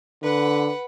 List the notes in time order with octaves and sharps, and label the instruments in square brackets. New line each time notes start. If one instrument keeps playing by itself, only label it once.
[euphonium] D3 [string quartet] B4 F#5